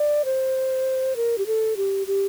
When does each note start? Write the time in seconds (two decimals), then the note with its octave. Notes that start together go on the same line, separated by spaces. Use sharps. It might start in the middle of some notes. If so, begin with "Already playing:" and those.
Already playing: D5
0.25 C5
1.16 A#4
1.38 G4
1.47 A4
1.77 G4
2.07 G4